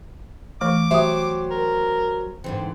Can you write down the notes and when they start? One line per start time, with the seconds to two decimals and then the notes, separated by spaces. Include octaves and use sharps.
0.61 E3 A3 D6
0.91 F#3 G4 C5 E5 D#6
1.51 A#4
2.44 G#2 D3 E3 C4